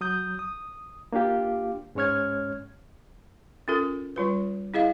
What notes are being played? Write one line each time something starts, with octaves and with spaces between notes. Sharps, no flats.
F#3 D#6 G6
D#6
A#3 D4 F4 G4 F5
G#2 G#3 C#4 C#5 F6 G#6
C#4 F4 A4 A#4
G3 F4 B4
E4 G#4 D#5 F5